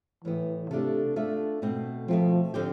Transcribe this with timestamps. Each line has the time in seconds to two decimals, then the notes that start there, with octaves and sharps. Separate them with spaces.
0.24 A2 E3 G3 B3
0.70 C3 A3 D4 F4 A4 E5
1.16 A3 D4 F4 A4 E5
1.62 B2 A3 C4
2.08 B2 F3 A3 C4
2.54 D3 F3 C4 G4